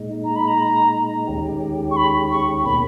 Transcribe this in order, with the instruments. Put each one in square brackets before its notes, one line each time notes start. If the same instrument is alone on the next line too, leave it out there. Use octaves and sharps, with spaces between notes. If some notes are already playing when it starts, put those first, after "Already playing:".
Already playing: [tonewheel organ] A#2 G#3 D#4
[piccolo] A#5
B5
A#5
[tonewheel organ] D#2 D#3 G#3 C#4 G4
[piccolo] C#6
B5
C#6
[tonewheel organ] B2 A#3 C#4 [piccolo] B5